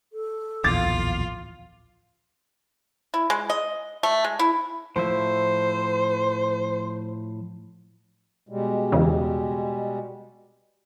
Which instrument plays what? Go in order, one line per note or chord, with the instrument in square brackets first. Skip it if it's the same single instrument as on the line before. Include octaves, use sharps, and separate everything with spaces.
[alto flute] A4
[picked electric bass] D1 A#1 E2 [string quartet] F4 F5 [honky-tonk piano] D6 A6
[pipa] E4
G#3
D#5
A3
G#3
E4
[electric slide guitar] A2 F3 E5 [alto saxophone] C5
[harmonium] B2 G3 G#3
[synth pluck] E2 C#3